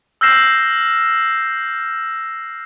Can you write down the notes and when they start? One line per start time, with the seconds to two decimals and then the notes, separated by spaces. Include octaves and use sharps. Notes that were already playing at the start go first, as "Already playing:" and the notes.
0.21 E6 F6 G6 A#6 C7 E7